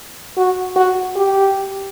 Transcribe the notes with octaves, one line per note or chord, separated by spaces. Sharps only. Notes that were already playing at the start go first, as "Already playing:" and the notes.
F#4
F#4
G4